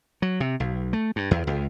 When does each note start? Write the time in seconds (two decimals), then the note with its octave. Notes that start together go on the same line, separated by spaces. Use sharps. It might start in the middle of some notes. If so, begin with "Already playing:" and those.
0.22 F#3
0.40 C3
0.60 B1
0.93 A3
1.16 G2
1.31 E2
1.47 C#2